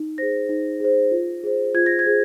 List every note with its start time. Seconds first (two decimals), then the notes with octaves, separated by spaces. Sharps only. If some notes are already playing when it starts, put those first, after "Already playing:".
Already playing: D#4
0.18 G#4 C5 A#6
0.49 D#4
0.80 G#4 C5
1.11 F4
1.44 G#4 C5
1.74 F4 G#6
1.86 A#6
1.99 G#6
2.06 G#4 C5